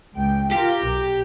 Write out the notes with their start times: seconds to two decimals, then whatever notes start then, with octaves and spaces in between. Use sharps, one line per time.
0.14 C#2 G5
0.51 F4 G4 A#4
0.86 B1